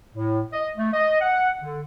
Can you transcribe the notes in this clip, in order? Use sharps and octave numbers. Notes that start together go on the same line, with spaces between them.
A2
D#5
A3
D#5
F#5
D3